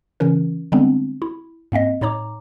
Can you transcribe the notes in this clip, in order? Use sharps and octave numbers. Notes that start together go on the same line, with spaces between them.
C#3 E3 C#4 A#4
D3 G3 G#3 B3 C4 D4
E4
G#2 A#3 C4 D#5
A2 D#4 C#5 A#5 D6